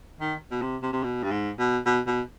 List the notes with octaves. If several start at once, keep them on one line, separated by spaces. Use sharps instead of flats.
D#3
B2
C3
C3
C3
B2
G2
G#2
B2
B2
B2